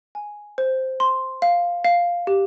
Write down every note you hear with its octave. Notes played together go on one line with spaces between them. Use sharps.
G#5
C5
C6
F5
F5
G4